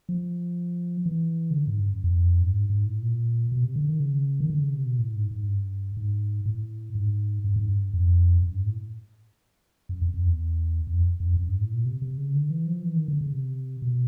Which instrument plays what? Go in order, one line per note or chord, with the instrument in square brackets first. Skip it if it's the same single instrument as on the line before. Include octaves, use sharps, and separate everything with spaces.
[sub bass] F3
E3
C#3
D3
G#2
G2
F#2
F2
G2
G#2
G#2
A2
A#2
B2
C3
D3
D#3
C#3
D#3
D3
C#3
C3
B2
A2
G#2
G#2
G2
G#2
A2
G#2
G2
G#2
G2
F2
F#2
G2
A2
F#2
F2
F2
E2
F2
F2
F#2
G2
A2
A#2
C3
C3
C#3
D3
E3
F3
E3
D#3
D3
C#3
C3
B2